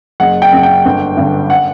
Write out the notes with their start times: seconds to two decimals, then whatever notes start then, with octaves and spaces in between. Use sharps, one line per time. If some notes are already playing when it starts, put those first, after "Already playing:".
0.20 F#1 F#5
0.42 G5
0.52 F#2 C#3
0.63 G5
0.85 G1
1.17 G2 D3
1.50 F#5